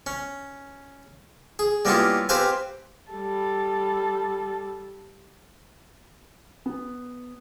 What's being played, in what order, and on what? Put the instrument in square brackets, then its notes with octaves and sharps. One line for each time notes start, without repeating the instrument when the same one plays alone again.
[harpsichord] C#4
G#4
G3 A#3 B3 C#4 E4 F4
C4 G4 B4 C5 F5 G#5
[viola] G3 A4
[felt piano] B3